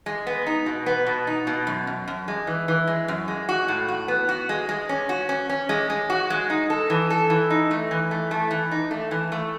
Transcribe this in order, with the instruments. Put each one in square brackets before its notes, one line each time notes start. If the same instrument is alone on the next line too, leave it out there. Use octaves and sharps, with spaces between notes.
[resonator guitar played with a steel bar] G#3
B3
D#4
B2
B3
B2
D#4
B2
F#2
F#2
F#2
G#3
E3
E3
G#3
F#2
G#3
F#4
A2
F#4
B3
F#4
G#3
G#3
C#4
F#4
C#4
C#4
G#3
G#3
F#4
G#3
D#4
A4
E3
A4
E3
D#4
A3
E3
A3
A3
E3
D#4
A3
E3
A3